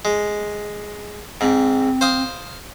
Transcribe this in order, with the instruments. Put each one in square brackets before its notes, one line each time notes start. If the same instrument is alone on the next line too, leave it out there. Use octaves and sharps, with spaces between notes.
[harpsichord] G#3
[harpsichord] G#2 [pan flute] C4
[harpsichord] C5 F5 D#6